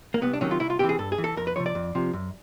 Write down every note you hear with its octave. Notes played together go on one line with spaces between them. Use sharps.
A#3
C2 B3
D4
C3 D#3 F#3 C#4
F4
C2 E4
F4
C3 E3 G4
G#4
G2 A4
G#4
E3
A4
F2 A#4
B4
C3 F3 C#5
D5
F2
C3 F3
F#2